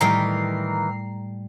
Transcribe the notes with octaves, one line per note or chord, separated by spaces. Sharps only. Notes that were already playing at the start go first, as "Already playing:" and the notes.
A2 D#3 E3 G3 A3 A#4 A#5 C7